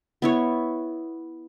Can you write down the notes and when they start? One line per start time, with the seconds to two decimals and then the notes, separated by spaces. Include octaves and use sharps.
0.22 B3 E4 C#5